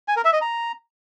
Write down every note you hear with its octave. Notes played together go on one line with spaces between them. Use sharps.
G#5
A#4
E5
D#5
A#5